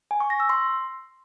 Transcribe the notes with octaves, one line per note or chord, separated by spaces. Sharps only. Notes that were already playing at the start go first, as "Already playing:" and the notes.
G#5
C#6
A#6
E6
C6